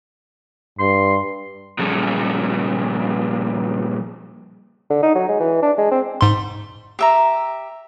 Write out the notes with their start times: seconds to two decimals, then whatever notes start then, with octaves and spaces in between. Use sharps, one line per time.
0.79 G2 C6
1.79 A#2 F3 G3 C#4 G#4 A4
4.90 D3
5.03 D#4
5.15 F#3
5.29 G#3
5.40 E3
5.62 D4
5.78 G#3
5.91 C4
6.21 G#2 C6
6.99 G4 E5 A#5